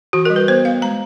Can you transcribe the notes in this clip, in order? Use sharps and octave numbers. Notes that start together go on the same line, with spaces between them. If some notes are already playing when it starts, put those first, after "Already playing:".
E3 F#4
A#4
G3
B4
B3 C5
B3 F5
G#3 A#5